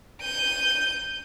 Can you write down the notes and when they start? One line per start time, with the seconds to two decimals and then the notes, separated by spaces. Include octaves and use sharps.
0.21 G6 D#7